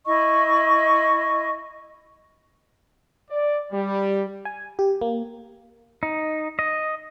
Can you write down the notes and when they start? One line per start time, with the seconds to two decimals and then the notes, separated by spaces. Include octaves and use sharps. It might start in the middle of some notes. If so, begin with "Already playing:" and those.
0.06 E4 D#5 C#6
3.30 D5
3.72 G3
4.45 G#5
4.79 G4
5.01 A#3
6.03 D#4
6.59 D#5